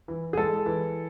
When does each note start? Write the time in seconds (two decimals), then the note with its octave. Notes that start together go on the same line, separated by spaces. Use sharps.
0.08 E3
0.33 G#4
0.37 G#3 A4
0.66 E3